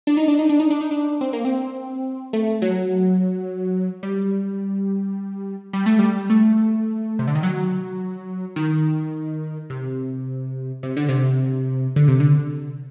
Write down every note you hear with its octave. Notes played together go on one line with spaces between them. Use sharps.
D4
D#4
D4
D#4
D4
D#4
D4
D#4
D4
C4
A#3
C4
A3
F#3
G3
G3
A3
G3
A3
C3
D3
D#3
F#3
D#3
C3
C3
D3
C3
D3
C3
D3